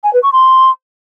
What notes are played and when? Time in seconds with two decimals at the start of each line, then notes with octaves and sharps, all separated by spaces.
0.03 G#5
0.13 B4
0.23 C#6
0.32 C6